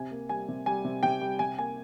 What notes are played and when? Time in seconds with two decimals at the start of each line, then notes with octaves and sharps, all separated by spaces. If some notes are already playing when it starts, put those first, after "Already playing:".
Already playing: C3 G#5
0.11 A#3
0.29 G3 G#5
0.48 C3
0.66 G3 G#5
0.85 C3
1.03 C3 G5
1.21 G3
1.39 C3 G#5
1.58 A#3 G#5